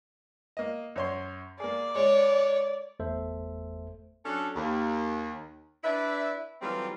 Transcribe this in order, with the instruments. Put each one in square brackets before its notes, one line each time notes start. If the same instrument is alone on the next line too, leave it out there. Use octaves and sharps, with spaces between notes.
[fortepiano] A#3 D#5
F#2 C#5 C6
[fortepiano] A#3 G#4 [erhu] D5
[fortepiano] G#3 [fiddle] C#5
[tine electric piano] G1 E2 A3 A4 C5 E5
[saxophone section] F#3 C#4 D4 A4
D#2
D4 E4 B4 D5 E5
E3 F#3 G3 A3 C4 F4